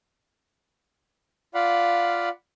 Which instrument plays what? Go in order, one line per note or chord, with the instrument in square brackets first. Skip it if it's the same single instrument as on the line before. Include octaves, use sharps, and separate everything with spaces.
[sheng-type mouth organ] F4 D5 F5 F#5 B5